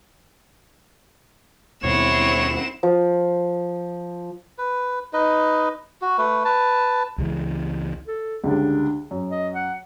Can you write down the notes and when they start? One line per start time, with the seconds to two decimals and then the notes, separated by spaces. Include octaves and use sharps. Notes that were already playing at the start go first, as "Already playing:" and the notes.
1.83 D#2 B2 G3 C4 E4 C#5 F#5 E7
2.83 F3
4.58 B4
5.13 D#4 B4 D#5
6.02 F#4
6.18 A3 B4
6.45 B4 A5
7.18 C#2 C#3 E3
8.07 A4
8.44 C#2 D3 G3 D4
9.11 F#2
9.31 D#5
9.55 F#5